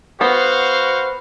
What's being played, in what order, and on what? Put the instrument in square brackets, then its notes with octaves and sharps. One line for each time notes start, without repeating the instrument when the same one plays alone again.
[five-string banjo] B3 [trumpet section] F#4 C5 F5